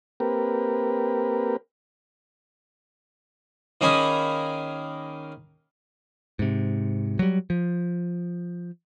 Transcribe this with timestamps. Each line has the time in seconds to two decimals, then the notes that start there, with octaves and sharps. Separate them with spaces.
0.20 A#3 C4 G4 A#4 B4
3.81 D#3 A#3 C#4 G#4 B5 D#6
6.39 G#2 C3
7.19 F#3 G3
7.50 F3